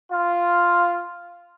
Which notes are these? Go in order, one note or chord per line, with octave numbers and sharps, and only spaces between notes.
F4